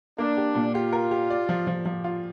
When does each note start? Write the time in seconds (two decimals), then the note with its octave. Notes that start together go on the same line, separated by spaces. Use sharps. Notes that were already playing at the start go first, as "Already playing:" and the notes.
0.18 A#3 D4
0.37 G4
0.55 A#2
0.74 F4 G4
0.93 A#4
1.11 G4
1.30 D5
1.49 F3
1.67 F3
1.85 F3
2.04 F4